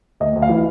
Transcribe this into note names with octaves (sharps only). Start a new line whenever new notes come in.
D2 D#5
D2
F5
E3